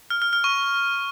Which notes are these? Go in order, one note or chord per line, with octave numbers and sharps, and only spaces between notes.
F6
F6
F6
C#6